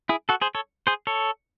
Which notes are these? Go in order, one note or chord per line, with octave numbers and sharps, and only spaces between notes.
E4 G#4
F#4 A4
G#4 C5
A4 C#5
G#4 C5
A4 C#5